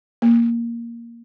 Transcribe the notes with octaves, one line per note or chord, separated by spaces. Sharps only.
A#3